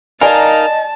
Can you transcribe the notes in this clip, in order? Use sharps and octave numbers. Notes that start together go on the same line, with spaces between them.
D#4 A#4 D5 D#5 F5 G#5 A5